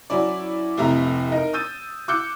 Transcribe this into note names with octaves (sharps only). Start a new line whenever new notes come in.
F#3 C#4 E4 D5
F1 A2 C3 E5 A#5
D#4 A#4
D#6 E6 G6 A6 D#7
D6 E6 F#6 G6 C#7